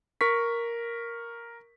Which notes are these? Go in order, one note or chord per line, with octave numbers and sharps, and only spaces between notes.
A#4 C#6 B6